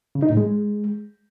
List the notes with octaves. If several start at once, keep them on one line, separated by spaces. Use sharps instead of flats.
C#3
D#4
A2
G#3